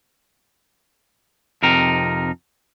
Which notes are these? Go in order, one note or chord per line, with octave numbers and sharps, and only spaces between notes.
F2 C3 D#4 A#4